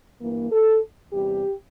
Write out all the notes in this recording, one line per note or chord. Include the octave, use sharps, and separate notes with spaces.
G2 E3 A#3
A4
E2 C3 G3 G4